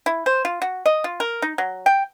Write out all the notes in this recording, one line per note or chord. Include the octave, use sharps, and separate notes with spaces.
E4
C5
F4
F#4
D#5
F4
A#4
D#4
F#3
G5